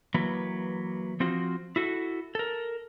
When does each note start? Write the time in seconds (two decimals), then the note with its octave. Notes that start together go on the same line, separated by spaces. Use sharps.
0.14 E3 F#3 A#3 B4
1.20 F3 C4 F4 F#4
1.76 E4 F#4 A4
2.35 A4 A#4